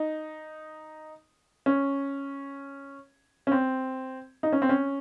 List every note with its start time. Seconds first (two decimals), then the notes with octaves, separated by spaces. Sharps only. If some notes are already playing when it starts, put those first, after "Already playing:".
Already playing: D#4
1.66 C#4
3.47 C#4
3.52 C4
4.43 D#4
4.53 C#4
4.62 C4
4.69 C#4